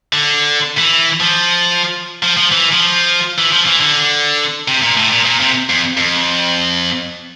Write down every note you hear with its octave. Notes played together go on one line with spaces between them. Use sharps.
D3
E3
F3
F3
F3
E3
F3
E3
F3
E3
D3
C3
A#2
A2
A#2
A#2
C3
F2
F2